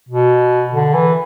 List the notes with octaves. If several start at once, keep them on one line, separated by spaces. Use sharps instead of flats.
B2
D3
E3